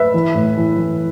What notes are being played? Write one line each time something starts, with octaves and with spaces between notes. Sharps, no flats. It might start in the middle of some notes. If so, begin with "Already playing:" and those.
Already playing: B4 E5
E3
A2
E3
E3